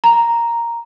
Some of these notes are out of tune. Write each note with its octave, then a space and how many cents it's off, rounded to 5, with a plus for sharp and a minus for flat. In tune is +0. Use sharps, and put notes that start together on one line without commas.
A#5 +0